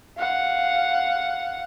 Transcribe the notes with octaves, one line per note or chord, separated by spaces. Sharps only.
F5 F#5